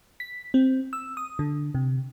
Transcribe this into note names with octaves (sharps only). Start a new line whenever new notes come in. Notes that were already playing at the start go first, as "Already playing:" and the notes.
B6
C4
E6
D#6
D3
C3